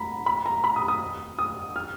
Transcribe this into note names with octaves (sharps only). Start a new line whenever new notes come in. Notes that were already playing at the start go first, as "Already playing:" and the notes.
Already playing: A#5 B5
B5
A#5
B5
D#6
D#6
D#6
F6